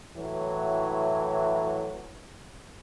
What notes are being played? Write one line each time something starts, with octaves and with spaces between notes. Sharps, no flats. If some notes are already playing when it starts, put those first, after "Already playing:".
A2 E3 F#3